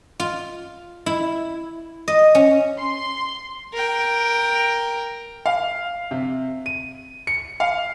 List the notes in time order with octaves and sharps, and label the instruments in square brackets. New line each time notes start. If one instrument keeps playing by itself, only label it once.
[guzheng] F4
E4
D#5
C#4
[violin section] C6
[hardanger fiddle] A#4 G5
[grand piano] F5
C3
D#7
C#7
F5